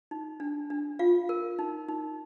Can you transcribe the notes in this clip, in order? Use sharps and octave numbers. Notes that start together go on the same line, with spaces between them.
D#4
D4
D4
F4 F5
A#4
D#4
D#4